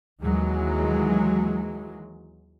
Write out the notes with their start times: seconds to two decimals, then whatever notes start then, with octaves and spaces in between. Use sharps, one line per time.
0.22 D#2 E3 F#3 G#3